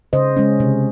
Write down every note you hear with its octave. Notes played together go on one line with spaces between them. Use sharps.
C#3 C5 D#5
G#3 C#4
C3